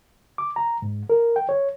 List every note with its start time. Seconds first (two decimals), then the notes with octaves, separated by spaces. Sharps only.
0.38 D6
0.56 A#5
0.82 G#2
1.10 A#4
1.36 G5
1.49 C#5